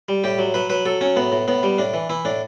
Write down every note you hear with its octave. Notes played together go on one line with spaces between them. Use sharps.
G3
A2 G4
F#3
F#3 B4
F#3 B4
F#3 A4
F#3 C#4
A2 B3
A2
A2 B3
G3
A2 D4
E3
E3 E4
A2 D4